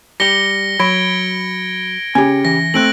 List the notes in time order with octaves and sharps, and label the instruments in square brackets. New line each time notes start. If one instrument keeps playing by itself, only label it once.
[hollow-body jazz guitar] G3 G4 [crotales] A#6 C#7 G7
[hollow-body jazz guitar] F#3 [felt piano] B5 [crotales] G#6 D7
[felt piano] C#3 G4 [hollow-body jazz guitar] G#5
[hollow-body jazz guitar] E3 [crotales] A#6
[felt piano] A3 C4 [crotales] F#6 D7 F#7